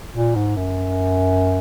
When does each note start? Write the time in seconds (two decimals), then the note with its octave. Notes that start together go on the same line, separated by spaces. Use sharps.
0.14 A#2
0.35 G#2
0.57 F#2